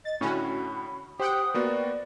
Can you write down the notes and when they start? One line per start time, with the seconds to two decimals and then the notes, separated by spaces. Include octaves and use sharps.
0.05 D#5 A6
0.21 A2 D3 C#4 F#4 B5
1.20 G4 C5 F#5 G5 D#6
1.54 A#3 B3 F#4 D5